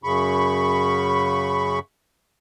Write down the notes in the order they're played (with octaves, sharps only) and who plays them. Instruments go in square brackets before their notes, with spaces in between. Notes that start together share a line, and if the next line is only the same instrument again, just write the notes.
[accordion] F#2 C#3 B5 C#6